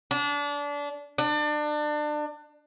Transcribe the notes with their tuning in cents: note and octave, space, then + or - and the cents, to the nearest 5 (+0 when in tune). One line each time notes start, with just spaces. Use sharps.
D4 -25
D4 +30